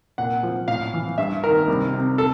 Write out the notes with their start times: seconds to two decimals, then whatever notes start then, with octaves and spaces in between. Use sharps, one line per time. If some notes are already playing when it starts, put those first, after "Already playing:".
0.18 A#2 F#5
0.43 F3
0.68 A2 F5
0.94 E3
1.18 G2 E5
1.44 D#3 A#4
1.68 C2
1.93 C3
2.18 A4